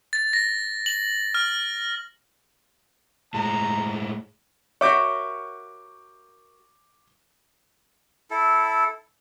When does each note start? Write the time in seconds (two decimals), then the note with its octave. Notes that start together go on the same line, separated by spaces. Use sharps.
0.13 A6
0.33 A#6
0.86 F#7
1.35 F6
3.34 A2 G#3 A#5
4.81 F#4 A#4 C#5 E5 C#6 D6 G6
8.31 E4 A4